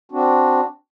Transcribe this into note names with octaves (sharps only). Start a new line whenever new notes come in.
C4 D4 F#4